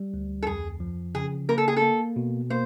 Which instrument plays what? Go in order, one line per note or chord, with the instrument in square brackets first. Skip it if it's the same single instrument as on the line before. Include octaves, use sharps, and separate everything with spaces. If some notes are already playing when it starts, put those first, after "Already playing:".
Already playing: [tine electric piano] G3
D2
[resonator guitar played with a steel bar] A4
[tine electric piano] F2 [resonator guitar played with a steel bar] G#4
[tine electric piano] F3
[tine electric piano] C#3 [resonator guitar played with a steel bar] G#4
[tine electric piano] A#3 [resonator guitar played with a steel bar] A#4
[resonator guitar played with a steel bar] A4
G#4
A4
[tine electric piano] A#3
B2
[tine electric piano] A#3 [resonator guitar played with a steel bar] C5